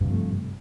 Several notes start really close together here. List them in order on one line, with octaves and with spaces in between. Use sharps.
G2 C3 F3 A3